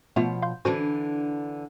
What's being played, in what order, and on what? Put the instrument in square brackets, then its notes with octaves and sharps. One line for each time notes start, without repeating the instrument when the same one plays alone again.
[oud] B2 F3 C#5 [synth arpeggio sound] A3 B3 F4
[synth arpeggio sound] F5 C6 G6
[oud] D3 E3 D4 [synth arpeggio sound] C#4 F#4 C5